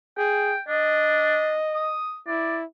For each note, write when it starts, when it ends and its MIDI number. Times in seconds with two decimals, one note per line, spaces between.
0.18 0.56 68
0.18 0.60 79
0.68 1.56 62
0.68 1.96 75
1.75 2.18 87
2.27 2.64 64
2.27 2.57 74